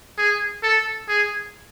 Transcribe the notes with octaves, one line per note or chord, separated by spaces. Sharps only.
G#4
A4
G#4